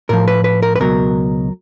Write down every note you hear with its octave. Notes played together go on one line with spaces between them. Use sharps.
A2 F3 A#4
B4
B4
A#4
B4
C#2 B2 F#3 A#4